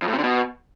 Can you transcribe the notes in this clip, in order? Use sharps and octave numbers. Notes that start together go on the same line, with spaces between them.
F2
A2
C3
D3
B2